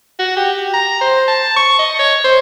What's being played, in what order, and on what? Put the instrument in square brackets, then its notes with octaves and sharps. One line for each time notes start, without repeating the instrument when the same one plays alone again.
[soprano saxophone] F#4
G4
A#5
C5
A5
C#6
D#5
C#5
C5